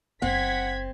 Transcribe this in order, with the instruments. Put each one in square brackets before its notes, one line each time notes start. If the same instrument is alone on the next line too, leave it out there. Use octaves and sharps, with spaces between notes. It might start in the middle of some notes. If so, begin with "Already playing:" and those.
[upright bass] F#1 F#2 [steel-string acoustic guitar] C4 [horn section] F#5 [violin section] G#6 B6